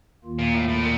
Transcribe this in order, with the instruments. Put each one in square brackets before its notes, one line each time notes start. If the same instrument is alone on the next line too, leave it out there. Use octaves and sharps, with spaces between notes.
[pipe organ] D#2 D#3 A#3 F4
[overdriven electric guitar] A#2
A2
A2
A#2